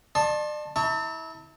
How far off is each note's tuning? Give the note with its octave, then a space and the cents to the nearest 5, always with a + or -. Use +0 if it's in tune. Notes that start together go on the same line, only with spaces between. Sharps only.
D5 +40 A5 +0 C6 +40
E4 -30 A5 +35 C#6 +25